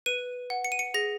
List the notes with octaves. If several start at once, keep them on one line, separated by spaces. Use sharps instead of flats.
B4 D#7
F#5
C#7
D#7
C#7
G#4 A#6